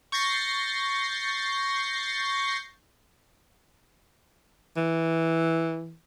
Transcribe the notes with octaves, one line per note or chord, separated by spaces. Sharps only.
C#6 G6 A6 A#6 C7
E3